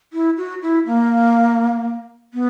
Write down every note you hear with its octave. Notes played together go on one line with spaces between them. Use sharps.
E4
F#4
E4
A#3
B3